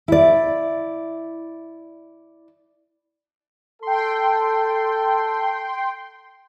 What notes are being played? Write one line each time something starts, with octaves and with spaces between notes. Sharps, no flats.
E4 D5
A4 G5 C6